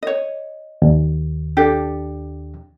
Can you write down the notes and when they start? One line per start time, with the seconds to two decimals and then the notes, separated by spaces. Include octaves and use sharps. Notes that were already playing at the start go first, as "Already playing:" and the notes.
0.03 C#5 D#5
0.82 D#2
1.57 D4 G4 A4